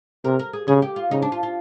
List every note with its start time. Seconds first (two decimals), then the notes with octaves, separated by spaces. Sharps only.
0.24 C3 A#4
0.39 A#4
0.53 G#4
0.68 C#3 G#4
0.82 G4
0.96 F4
1.11 C#3 D#4
1.22 D4
1.32 F4
1.43 F4